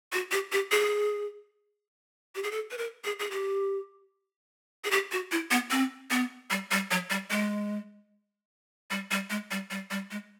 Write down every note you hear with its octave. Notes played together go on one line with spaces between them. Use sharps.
F#4
G4
G4
G#4
G4
G#4
A4
B4
A#4
G#4
G#4
G4
G#4
G4
F#4
E4
B3
C4
B3
G3
G3
F#3
G3
G#3
G3
G3
G#3
G3
G3
G3
G#3